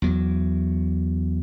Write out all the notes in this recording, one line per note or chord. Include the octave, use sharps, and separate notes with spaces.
E2 F#3